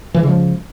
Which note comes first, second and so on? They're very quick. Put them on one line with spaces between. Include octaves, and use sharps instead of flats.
E3 G#3 C#3 F3